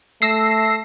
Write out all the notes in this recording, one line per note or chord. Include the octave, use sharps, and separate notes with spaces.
A3 E6 A#6 C7